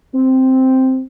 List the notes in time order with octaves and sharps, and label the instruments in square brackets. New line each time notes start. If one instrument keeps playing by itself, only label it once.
[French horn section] C4